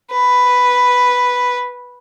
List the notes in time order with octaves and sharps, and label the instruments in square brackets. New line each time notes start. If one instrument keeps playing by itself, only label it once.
[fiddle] B4